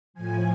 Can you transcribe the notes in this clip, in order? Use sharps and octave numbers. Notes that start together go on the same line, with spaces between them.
A2 F3 G#5